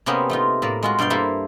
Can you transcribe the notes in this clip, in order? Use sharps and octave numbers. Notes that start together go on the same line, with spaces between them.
C3 A#3 B3 C#4 G4 G#4
A3 D#4 F4
A2 A#3 D5
G#3 F4 F#4
G2 B2 D5 F5 G5
A#3 E4 G4 A4 C5